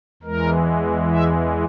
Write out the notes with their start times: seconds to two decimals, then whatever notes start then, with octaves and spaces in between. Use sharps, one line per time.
0.23 E2 E3 G#3 A#4
1.11 E5